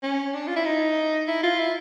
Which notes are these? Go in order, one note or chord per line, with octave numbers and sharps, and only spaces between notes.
C#4
D4
F4
E4
D#4
E4
F4
E4